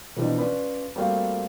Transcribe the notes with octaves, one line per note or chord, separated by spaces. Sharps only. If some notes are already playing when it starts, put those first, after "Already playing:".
B2 E3 F3 C4 D4 D#4
C#4 F4 B4 D5 B5
G3 A3 A#3 C4 F#4 F5